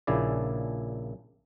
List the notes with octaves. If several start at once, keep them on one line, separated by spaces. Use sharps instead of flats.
A#1 A#2 C#3 E4 G#4 D5